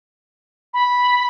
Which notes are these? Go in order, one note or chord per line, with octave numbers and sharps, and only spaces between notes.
B5